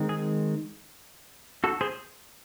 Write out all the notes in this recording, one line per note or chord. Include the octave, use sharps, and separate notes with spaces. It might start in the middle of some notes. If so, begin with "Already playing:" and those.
Already playing: D#3 G#3 C4
G#4
F#4 A4
G#4 C5